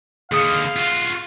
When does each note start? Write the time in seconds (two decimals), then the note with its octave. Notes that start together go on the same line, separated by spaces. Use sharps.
0.32 D#2 D3 G#4 F5 D#6 C#7
0.76 F4 F#4